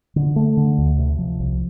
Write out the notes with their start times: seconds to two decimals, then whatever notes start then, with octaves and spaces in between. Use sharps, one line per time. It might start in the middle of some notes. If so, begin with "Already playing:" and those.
0.16 D3
0.36 A3
0.57 D3
0.78 D2
0.98 C3
1.19 F3
1.40 C2